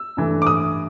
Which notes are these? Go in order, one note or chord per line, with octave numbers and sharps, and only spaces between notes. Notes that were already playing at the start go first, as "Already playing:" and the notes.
Already playing: E6
G2 E3 A3
D6
D#6